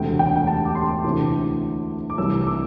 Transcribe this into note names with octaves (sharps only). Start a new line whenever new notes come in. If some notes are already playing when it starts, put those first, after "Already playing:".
Already playing: E1 D2 C3 G5
G5
G5
A5
D6
C6
D2 C3 E3 D6
D6
C2 C3 E3 E6
E6
D6